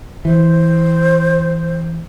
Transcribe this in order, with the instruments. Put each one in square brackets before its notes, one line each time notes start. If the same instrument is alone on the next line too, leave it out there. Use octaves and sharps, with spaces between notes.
[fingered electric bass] E3 [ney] C5